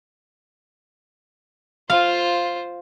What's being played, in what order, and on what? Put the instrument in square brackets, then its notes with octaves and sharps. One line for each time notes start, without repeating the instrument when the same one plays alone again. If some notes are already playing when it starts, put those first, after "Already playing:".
[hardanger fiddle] F4 C5 [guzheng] F5